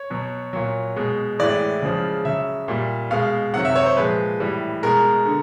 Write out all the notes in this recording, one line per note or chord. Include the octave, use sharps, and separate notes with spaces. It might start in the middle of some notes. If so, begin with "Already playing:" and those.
Already playing: C#5
B2 F#3
A#2 F#3
B2 G#3
A2 E3 G#3 D5
C#3 F3 G#3
C#3 F#3 E5
A#2 G3
B2 G#3 F5
C3 D#3 F#3 F#5
E5
C#5
C5
A#2 F3 G#3 B4
A2 E3 G3
B2 G#3 A#4
D3